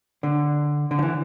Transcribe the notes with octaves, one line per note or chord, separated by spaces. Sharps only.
D3
D3
F3
E3